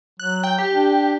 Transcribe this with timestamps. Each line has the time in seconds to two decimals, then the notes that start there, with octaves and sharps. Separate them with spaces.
0.20 F#3 F#6
0.44 G5
0.58 G4
0.74 D4